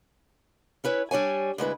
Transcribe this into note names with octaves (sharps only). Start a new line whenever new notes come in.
C#4 E4 B4 C#5
G3 D4 C#5 G#5
D2 G#3 E4 B4